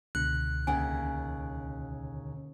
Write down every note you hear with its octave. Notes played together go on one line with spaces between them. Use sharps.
C#2 B2 D3 F#6
D#2 C#3 F#5 G#5